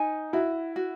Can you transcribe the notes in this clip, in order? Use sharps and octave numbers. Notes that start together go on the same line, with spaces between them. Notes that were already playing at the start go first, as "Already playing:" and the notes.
Already playing: D#4 G#5
E4 F#4
F#4